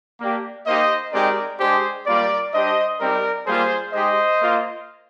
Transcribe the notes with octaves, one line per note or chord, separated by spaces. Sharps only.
A#3 D4 G4
A#3 D#4 G4 C5 D#5
G#3 C4 D#4 G4 A#4 D5
G#3 D4 G4 G#4 C5
G3 A#3 F4 A#4 D5
G3 D4 G4 C5 D#5
G3 C4 D#4 G4 A#4 D5
G3 A#3 F4 G#4 C5
G#3 D#4 G4 C5 D#5
A#3 F4